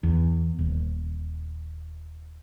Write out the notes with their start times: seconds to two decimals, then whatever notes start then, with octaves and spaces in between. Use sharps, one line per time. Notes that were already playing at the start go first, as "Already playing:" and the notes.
0.03 E2
0.59 D#1